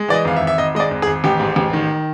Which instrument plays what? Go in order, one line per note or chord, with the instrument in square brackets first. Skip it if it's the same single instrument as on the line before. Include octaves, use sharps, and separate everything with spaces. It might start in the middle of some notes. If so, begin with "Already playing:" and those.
Already playing: [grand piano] G#3
E3 D5
D#5
G#1 F5
E5
G#1
E5
G#1 D#5
G#3 D#5
D5
G#1
G#4
G#1
A1 G4
G#2
A1
D#3